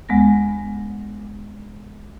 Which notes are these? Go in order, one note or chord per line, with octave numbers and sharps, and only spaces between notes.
D2 G#3 B3 A#6